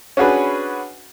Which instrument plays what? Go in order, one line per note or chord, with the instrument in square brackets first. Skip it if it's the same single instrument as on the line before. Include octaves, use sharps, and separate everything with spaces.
[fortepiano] C#4 D4 F#4 G#4 B4